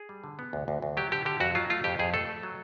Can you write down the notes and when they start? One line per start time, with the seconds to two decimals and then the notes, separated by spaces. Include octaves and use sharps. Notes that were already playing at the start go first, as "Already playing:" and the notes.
Already playing: G#4
0.09 G3
0.24 D3
0.39 B3
0.53 D2
0.68 D2
0.82 D2
0.97 F#3 G4
1.12 D3 G4
1.25 D3 G4
1.40 F2 F#4
1.55 F#3 F4
1.70 A3 F4
1.84 F2 G4
1.99 F2 G#4
2.14 A3 A4
2.28 A3
2.43 F#3